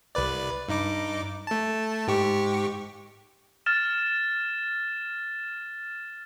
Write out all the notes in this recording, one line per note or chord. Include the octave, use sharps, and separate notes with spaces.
C2 B4 D5
G2 D#4 D6
A3 A5
G#2 G4 C#6
F6 A6 E7